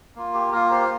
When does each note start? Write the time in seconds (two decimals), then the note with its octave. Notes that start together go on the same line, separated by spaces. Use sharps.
0.15 A#3 F4
0.34 G4
0.52 A#3 F4 A#4
0.71 G4 C5